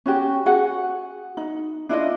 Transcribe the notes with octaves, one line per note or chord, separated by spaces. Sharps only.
C#4 F#4 G4
F#4 G#4 F#5
D#4
D4 E4 F4 D#5